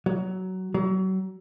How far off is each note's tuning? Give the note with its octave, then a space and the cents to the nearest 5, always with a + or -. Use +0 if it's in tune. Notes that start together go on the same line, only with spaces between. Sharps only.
F#3 +15
F#3 +35